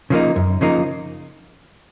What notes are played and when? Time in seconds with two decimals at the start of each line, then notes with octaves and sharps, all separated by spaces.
0.10 C#3 F3 A#3 D#4
0.36 F#2
0.61 C#3 F3 A#3 D#4